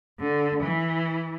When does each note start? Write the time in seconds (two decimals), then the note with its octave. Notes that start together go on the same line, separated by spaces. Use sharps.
0.19 D3
0.63 E3